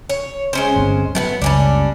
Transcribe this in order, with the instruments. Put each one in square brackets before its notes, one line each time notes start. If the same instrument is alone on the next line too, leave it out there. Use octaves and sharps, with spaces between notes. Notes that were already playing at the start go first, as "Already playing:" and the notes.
[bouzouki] C#5
G#3 C#4 C5
[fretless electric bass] G1 D2 C4
[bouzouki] A2 B3 F#4 [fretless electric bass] F#3
[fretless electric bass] F#1 C#2 [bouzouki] G3 C#4 D4